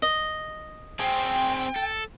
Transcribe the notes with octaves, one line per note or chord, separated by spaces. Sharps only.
D#5
C4 G#4 G5
A4